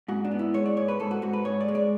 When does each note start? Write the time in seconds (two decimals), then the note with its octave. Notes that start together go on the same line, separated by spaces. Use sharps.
0.08 G#2 F#4
0.25 D4
0.31 B3
0.39 E4
0.54 G#3 C#5
0.66 D5
0.77 G#2 C#5
0.88 B4
1.00 G#2 A4
1.11 F#4
1.22 G#2 F#4
1.33 B4
1.45 G#2 C#5
1.61 D5
1.68 G#3
1.75 D5